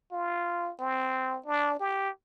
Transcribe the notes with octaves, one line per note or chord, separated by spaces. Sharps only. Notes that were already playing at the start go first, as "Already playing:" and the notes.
F4
C4
D4
G4